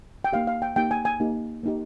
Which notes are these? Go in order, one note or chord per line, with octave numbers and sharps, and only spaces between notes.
G5
A#3 D#4 G4 F5
F5
G5
A#3 D#4 G4 G5
G#5
G#5
A#3 D#4 G4
A#3 D#4 G4